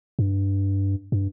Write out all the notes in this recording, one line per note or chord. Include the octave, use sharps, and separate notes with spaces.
G2
G2